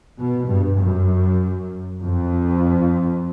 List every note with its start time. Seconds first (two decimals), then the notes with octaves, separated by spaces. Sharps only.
0.17 B2
0.48 G2
0.80 F#2
2.03 F2